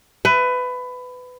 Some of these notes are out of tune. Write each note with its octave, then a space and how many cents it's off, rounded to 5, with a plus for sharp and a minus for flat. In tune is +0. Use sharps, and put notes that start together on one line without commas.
B4 +20 E5 +5